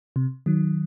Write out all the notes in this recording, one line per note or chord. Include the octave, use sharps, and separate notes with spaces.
C3
D#3 F#3